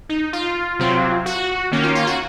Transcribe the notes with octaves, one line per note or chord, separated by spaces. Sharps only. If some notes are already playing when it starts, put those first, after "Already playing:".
D#4
F4
C3 F#3 C4
F#4
D#3 A#3 C#4
F4
F4
F#4